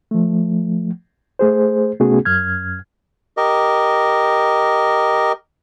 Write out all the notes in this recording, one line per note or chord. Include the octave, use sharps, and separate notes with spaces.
F3 A3
A3 G#4 C5
C3 A3 B3 C#4 F#4 G#4
F#2 F6 G#6
G4 A#4 D#5